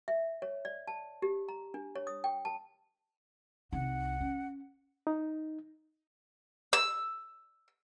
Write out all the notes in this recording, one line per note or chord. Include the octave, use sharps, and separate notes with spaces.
E5
C#5
D5
A5
G4
A#5
D4
C#5
D#6
G5
A5
C2 D#4 F#5
C#4
D#4
E6